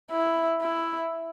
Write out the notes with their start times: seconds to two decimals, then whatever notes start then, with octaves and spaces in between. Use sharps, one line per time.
0.12 E4
0.62 E4